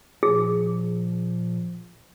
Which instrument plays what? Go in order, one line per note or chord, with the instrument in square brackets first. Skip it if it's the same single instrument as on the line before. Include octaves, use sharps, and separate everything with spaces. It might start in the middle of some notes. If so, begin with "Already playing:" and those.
[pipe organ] A#2 F3 [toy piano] G#4